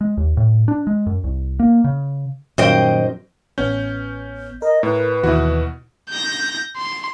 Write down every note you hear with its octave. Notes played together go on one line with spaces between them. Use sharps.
G#3
D#2
A2
D4
G#3
F#2
C2
A#3
C#3
F#2 A#2 D#3 G3 C5 D#5 G5
A1 B3 C#4 G6
A#4 D#5
A2 B4
D#2 B2 E3 E4 F#4
G6 A#6
C6